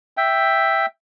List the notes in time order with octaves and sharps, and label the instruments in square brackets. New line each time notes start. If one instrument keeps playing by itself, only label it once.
[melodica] E5 G5